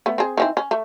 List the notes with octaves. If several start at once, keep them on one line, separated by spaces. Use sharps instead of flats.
A3 B3
C4 G#4
D#3 E3 C4
C#4
A3